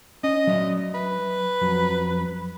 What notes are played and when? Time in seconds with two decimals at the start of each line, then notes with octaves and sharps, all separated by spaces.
0.24 C#4 D#5
0.47 F#3 D5 E5
0.94 B4
1.61 F2 F#3